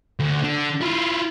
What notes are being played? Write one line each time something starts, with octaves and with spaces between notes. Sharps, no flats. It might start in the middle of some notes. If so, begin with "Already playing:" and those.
D2
D3
E4 F4